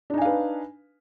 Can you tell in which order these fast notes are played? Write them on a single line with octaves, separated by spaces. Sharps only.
D4 D#4 G#5 F5 B4